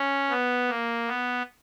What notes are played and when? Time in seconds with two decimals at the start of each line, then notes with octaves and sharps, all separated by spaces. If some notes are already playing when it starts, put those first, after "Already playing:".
Already playing: C#4
0.29 B3
0.68 A#3
1.07 B3